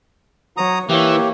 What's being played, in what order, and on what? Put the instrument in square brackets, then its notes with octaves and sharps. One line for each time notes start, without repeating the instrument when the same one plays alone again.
[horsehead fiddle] F#3 C#5 [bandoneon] A#5 D#6
[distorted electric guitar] E3 [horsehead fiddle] A#3 C#5 [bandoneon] G4